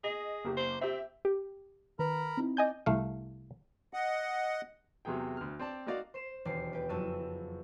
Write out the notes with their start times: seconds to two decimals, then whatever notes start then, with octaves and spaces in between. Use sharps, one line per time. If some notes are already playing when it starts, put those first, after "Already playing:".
0.04 G#4 D#5
0.45 F#1 A#3 G4
0.57 C5
0.81 C4 G4 E5
1.25 G4
1.99 D#3 A#4 B4 A#5 B5
2.37 C4 D#4 E4
2.57 D5 D#5 G#5 G6
2.86 C2 A3 F5
3.93 D#5 F#5
5.05 E2 C3 F#3 G#4 G5
5.37 D2 F6
5.59 C4 D5 A5
5.87 A#3 D#4 F#4 D5 F5
6.14 C5 C6 E7
6.45 E1 D#2 A4 D5 G5 C7
6.73 B4 G5
6.89 F#1 F2 F#4 A5 E6 D#7